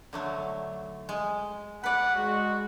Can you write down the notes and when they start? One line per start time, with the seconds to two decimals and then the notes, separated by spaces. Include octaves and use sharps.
0.13 D3 F#3 A3
1.09 G#3
1.84 B4 D5 F#5
2.15 G#3 F#4